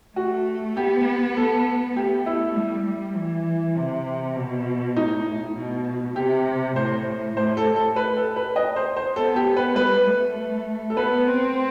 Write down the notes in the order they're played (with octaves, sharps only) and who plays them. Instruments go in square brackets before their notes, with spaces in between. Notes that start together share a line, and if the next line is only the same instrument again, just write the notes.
[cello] A3 [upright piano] F#4
[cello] B3 [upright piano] G4
[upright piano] A4
[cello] A3 [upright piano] G4
[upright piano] E4
[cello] G3
G3
E3
C3
B2
[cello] A2 [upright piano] D#4
[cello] B2
[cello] C3 [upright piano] G4
[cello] A2 [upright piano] C5
[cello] A2 [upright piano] C5
[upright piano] A4
A4
B4
A4
B4
D#5
C5
C5
[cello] B3 [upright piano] A4
[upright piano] G4
[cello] B3
[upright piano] B4
[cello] G3 [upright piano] B4
[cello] A3
[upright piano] A4
[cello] B3 [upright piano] B4
[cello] C4